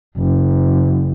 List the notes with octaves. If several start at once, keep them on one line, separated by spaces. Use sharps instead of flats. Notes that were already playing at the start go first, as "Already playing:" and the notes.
F#1